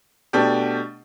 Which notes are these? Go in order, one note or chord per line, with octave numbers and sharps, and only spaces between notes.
B2 A3 D4 G4